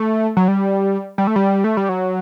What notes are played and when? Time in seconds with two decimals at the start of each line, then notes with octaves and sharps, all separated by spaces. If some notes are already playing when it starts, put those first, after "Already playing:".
Already playing: A3
0.37 F#3
0.48 G3
1.18 G3
1.27 A3
1.36 G3
1.64 A3
1.77 G3
1.89 F#3